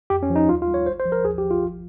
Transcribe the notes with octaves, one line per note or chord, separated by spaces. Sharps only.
F2 G4
C#4
F3
D#4
D#2 F4
F4
G3
C#5
G#1 C5
C5
F3
A#4
D#2 G#4
G4
F3
F4
G#1